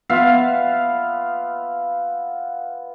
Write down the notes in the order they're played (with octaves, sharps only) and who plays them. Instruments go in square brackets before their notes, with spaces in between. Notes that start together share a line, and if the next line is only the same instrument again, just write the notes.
[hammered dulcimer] B3 F4 E5 F5